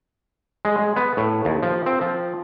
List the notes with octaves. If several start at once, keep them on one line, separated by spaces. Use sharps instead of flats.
G#3
G#3
B3
A2
D#2
F3
C4
F3